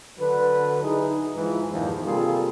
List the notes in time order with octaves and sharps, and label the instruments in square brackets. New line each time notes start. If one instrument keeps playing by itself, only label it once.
[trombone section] D3 F#3 D4 B4
D#4 E4 G#4
G#2 E3 F3
E2 G2 A#2 D#3 F3
C3 G3 A#3 F4 G#4 A4